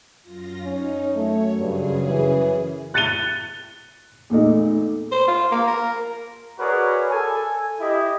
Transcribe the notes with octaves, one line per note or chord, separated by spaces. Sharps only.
F#2 F4 A#6
C#4 D#4
F#2 A3 C#5
G2 C#3 G#4
E3
F#6 A6 C#7 D#7 G7
E2 A#2 A3 D#4
C5
F4
A#3
A#4
F#4 G#4 A#4 B4 C#5 D5
A4 G#5
E4 G4 D#5